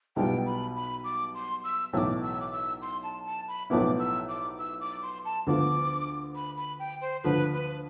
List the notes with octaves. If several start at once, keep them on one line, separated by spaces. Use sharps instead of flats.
B1 B2 G3 B3 F4 G5
B5
B5
D6
C6
E6
B1 A2 E3 D6 E6
E6
D6
E6
C6
A5
A5
B5
B1 A2 F3 B3 E4 D6
E6
D6
E6
D6
C6
A5
D2 D3 F3 B3 F4 D6
B5
B5
G5
C5
D2 D3 F3 B4
B4